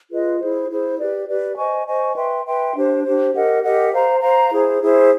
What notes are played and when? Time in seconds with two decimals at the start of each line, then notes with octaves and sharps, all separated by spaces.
0.10 F4 G#4 B4 D#5
0.39 E4 G#4 C5
0.69 E4 G#4 C5
0.98 G4 B4 D5
1.27 G4 B4 D5
1.57 C5 D#5 G#5 C#6
1.86 C5 D#5 G#5 C#6
2.15 B4 E5 G5 C6
2.45 B4 E5 G5 C6
2.75 D4 G4 C5
3.04 D4 G4 C5
3.34 G4 A#4 D#5 F#5
3.63 G4 A#4 D#5 F#5
3.91 C5 F5 A#5
4.21 C5 F5 A#5
4.51 E4 G#4 C5
4.81 E4 G#4 C5